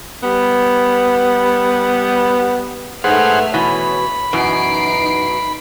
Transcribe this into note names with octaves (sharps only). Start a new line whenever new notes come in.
G3 B3
G#2 A3 B3 G#4 C5 E5 F#5 F6
B2 E3 C#5 B5
F#2 B2 E3 D#4 C7 D7